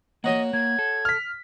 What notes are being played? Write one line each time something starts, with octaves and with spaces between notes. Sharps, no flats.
A#3 F#4 C#5 D#5 F#5
A#3 G#6
A4
F6 B6